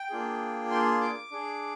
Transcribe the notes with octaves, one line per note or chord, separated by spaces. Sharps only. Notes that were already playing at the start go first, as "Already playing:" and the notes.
Already playing: G5
A#3 D4 F4 G#4
C6
D6
D4 G#4